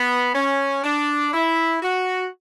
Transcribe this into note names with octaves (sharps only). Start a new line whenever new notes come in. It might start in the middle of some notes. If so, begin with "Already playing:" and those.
Already playing: B3
C#4
D4
E4
F#4